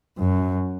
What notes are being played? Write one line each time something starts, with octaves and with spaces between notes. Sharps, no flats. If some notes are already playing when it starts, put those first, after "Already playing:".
F#2